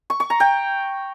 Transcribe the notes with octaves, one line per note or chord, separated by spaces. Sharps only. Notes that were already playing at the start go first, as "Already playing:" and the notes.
C#6
C#6
A#5
G5